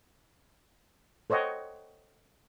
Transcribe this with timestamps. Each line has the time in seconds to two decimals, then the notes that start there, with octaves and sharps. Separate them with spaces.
1.30 A4 C5 C#5 D#5 F#5 G5